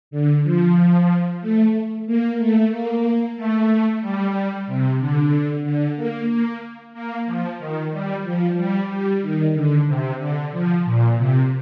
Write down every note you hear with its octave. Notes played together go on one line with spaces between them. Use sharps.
D3
F3
A3
A#3
A3
A#3
A3
G3
C3
D3
D3
A#3
A#3
A#3
F3
D#3
G3
F3
G3
G3
D#3
D3
C3
D3
F3
A#2
C3